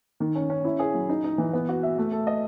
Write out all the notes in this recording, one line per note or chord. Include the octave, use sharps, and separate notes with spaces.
D#3
C#4
C#4
E4
G#4
F#3
D#4
D#4
E3
B3
F#4
E5
A3
A4
D#5